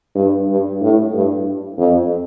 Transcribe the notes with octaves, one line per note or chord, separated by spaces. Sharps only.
G2
G2
A2
G2
F2